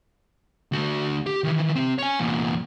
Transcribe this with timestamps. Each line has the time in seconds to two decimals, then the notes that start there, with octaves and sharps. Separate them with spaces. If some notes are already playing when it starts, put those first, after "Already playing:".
0.72 D2 F#4
1.26 G4
1.44 D#3 E3
1.76 C4 G4
1.98 C#5 G#5
2.20 E2 A#2